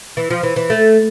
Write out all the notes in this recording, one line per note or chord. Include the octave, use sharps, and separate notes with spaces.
E3
F3
E3
E3
A3